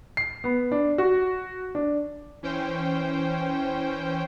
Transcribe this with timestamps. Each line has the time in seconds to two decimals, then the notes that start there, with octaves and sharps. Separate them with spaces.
0.17 C7
0.44 B3
0.72 D4
0.98 F#4
1.75 D4
2.43 E3 C#4 C5 G5